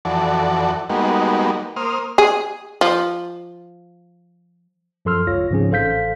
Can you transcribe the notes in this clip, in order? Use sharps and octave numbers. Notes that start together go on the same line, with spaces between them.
F2 E3 F#4 A4 D5
G3 G#3 A#3 B3 D#4 F#4
A#3 C5 D#6 F6
G#4
F3
F#2 F3 A4 C6 E6 F6
G#1 C#2 F4 C#5 A#6
G#2 C#3 F3 C4 C#4 G#4
A1 A4 C5 F5 G6 B6